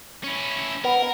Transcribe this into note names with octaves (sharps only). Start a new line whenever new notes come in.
C#4 E4
B3 A#4